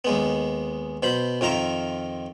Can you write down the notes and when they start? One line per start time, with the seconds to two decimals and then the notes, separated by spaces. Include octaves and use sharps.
0.05 D#2 G#3 B3
1.03 B2 C5 B5
1.41 F2 D#3 F4 E5 A#5